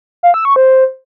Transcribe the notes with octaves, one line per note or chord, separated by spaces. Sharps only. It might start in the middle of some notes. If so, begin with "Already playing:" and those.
F5
E6
C#6
C5